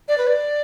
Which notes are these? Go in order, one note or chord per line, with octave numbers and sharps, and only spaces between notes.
D5
B4
D5